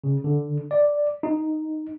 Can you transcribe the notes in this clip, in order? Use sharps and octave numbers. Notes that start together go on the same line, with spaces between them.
C#3
D3
D5
D#4